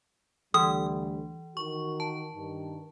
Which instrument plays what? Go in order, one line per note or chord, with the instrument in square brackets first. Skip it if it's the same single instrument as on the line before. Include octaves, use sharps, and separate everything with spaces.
[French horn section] D2 G3 [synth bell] E3 [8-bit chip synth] D#6
[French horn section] D#3 F#4 A#4 [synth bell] C#6
[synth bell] A5
[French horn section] G2 D#3